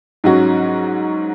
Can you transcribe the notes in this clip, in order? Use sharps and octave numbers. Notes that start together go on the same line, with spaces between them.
G#2 F#3 C#4 F#4